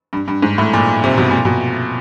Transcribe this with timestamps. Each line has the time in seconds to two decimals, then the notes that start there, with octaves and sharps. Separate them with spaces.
0.13 G2
0.28 G2
0.42 G#2
0.58 A2
0.73 A#2
1.04 C3
1.18 B2
1.31 A#2
1.45 B2